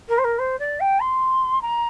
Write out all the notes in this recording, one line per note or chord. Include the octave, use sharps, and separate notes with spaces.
A#4
C5
A#4
C5
D5
G5
C6
A#5